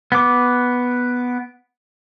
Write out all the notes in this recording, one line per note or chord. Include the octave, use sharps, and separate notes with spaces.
B3 D6